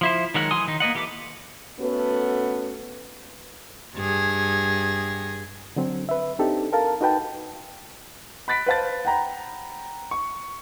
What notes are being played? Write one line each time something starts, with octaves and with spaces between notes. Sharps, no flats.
F3 E4 C5
D#3 F#3 G#3 A#4 F#5
E3 F#3 G#5 C6 D#6
D#3 D#4
A#3 B3 D#5 F#5
E3 G4 A4 B4 D6
A3 B3 C#4 F#4 A4 B4
G2 G#4
D3 F#3 C4
B4 E5
C4 D4 D#4 G4 A4
A4 A#4 F5 A5
D#4 F#4 B4 G5 A5
B5 F#6 A6 B6 D7
B4 C5 F5 A5 A6
F#5 G5 A#5 B5
C#6